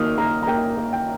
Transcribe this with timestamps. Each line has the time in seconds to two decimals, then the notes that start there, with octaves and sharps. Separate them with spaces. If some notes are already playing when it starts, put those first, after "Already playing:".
Already playing: D#3 A#3 D#6 F6
0.18 A#3 A#5
0.43 A#5
0.47 A#3 G5
0.77 A#3
0.93 G5